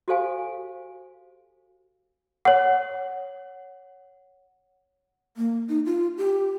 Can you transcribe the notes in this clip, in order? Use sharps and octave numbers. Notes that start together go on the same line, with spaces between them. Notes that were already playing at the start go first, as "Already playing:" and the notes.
F#4 G4 A4 C5 F5 G#5
C#5 F#5
A#3
D#4
F4
G4